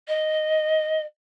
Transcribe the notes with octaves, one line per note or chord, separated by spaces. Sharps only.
D#5